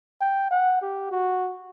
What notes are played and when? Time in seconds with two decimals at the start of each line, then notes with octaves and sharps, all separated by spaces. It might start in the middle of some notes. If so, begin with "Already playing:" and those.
0.21 G5
0.50 F#5
0.82 G4
1.11 F#4